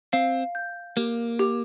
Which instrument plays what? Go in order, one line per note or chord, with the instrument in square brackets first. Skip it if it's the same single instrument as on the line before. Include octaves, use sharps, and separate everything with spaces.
[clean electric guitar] C4 [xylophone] F5
[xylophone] G6
[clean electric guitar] A#3 [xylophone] G4
[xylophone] G4